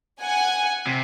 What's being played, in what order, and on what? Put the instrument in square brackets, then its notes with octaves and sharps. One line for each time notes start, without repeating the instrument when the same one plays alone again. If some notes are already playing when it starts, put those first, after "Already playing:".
[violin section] F#5 G#5
[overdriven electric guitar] C3